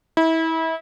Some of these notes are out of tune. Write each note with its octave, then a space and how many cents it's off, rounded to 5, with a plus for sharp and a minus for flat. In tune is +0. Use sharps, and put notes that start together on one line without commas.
E4 -30